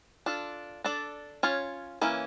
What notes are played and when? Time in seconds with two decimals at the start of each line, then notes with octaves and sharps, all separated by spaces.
0.26 D4 F4 A4
0.84 D4 A4 D5
1.43 C#4 F4 C#5
2.01 E3 A#3 C#4